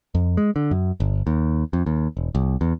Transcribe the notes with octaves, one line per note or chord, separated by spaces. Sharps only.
F2
G#3
D3
F#2
G1
D#2
F2
D#2
E1
C2
E2